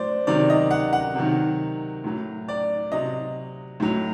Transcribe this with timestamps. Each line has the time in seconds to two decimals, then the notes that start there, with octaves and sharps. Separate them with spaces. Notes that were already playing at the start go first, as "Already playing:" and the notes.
Already playing: A2 F#3 C5 D5
0.27 C3 D#3 F#3 D5
0.50 D#5
0.71 F#5
0.93 F#5
1.15 C3 D#3 F#3
2.04 A2 F#3
2.48 D5
2.92 C3 F#3 D#5
3.80 A2 F#3